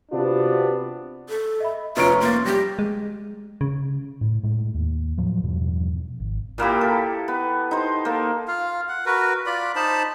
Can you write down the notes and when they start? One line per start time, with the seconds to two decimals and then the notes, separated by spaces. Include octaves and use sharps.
0.12 C3 B3 D4 F4 F#4
1.29 A4
1.60 D#5 E5 B5
1.97 F1 C#4 F4 B4 A#5 C#6 D7
2.21 A#3 C6 A6
2.46 G3 G4 A#6
2.79 G#3
3.61 C#3
4.21 A2
4.43 A2 G#3
4.74 D#2
5.17 A2 F3 F#3
5.43 E2 G2 B2 F3
6.20 G#1
6.58 A#2 A#3 E4 G4
6.81 A4
7.28 B3
7.71 D#4 C5
8.05 A#3 A4
8.48 F4 F5
8.89 F#5
9.06 F#4 A#4 B4
9.46 F4 D5 B5
9.76 D#4 C5 A5 B5